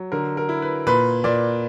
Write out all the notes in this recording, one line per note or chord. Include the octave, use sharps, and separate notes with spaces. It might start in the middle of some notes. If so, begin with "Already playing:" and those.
Already playing: F#3
D3 A#4
A#4
E4
B4
A#2 B4
A#2 D5